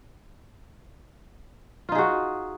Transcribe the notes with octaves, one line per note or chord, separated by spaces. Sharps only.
D#4 F4 F#4 G#4